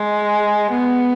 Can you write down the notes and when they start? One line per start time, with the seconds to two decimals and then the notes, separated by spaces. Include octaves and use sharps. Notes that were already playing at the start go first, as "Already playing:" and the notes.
Already playing: G#3
0.72 B3